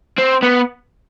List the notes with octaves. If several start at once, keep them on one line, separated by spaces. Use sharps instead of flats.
C4
B3